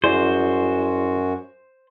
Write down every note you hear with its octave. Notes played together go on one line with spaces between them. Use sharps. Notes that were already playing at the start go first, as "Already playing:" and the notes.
F#2 E4 F#4 G#4 C5 D5